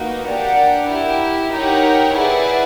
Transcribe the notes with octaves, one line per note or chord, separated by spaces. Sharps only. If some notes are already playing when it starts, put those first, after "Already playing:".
Already playing: A#3 D#4 F#4 B4
D4 G4 A#4 D5 F#5
E4 G4 A#4
D#4 G4 A#4 C#5 F#5
E4 G#4 B4 D5 F#5